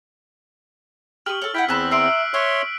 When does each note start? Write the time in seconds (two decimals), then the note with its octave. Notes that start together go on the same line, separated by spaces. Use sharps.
1.26 G4 C#6 D#6 F6 F#7
1.42 A4 C#5
1.54 E4 F#5 G5 E6 F6 B6
1.69 E2 C4 G#4 A5 B5 E6 F#6
1.91 E5 A#5 C6 E6 C7 D7
2.34 C#5 E5 C6 C#6 D#6